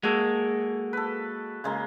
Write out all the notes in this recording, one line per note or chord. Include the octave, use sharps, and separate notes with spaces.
G#3 A#3 F#4 A4
A4 B4
C#3 G#3 A#3